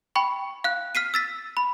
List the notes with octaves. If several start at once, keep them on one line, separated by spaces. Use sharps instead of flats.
G5 B5 C#6
F5 F#6
F6 B6 C7 D#7
E6 A6 B6
B5